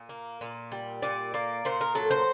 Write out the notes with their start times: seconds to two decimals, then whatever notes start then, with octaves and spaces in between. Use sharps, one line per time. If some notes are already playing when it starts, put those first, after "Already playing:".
Already playing: A#2
0.09 A#3
0.41 A#2
0.72 G3
1.02 A#2 D5
1.34 A#3 D5
1.65 A#2 C5
1.81 A#4
1.95 F#3 A4
2.11 C5